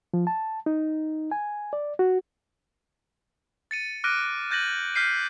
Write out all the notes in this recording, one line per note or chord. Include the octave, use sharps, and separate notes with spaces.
F3
A5
D#4
G#5
D5
F#4
A6 C#7 D#7
D6 F6 F#6 A#6 D7 D#7
F#6 G6 A6 A#6 D#7 F#7
F6 G6 B6 C7 D#7